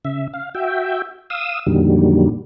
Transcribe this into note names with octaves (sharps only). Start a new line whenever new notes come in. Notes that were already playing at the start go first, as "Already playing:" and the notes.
C#3 E5
F5
F#4 E5 G5
F5 D#6 E6
F2 A#2 D3 D#3 F#3 G3